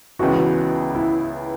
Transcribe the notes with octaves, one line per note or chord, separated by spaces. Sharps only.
C#2 C#3 E3 B3 F#4
E4